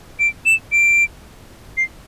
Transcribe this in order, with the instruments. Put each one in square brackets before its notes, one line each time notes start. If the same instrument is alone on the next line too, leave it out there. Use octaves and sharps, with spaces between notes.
[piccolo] D7
E7
D7
C7